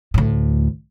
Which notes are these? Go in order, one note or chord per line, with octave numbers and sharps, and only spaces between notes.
D2 A2